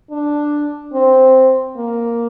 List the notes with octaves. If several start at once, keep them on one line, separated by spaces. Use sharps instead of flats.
D4
C4
A#3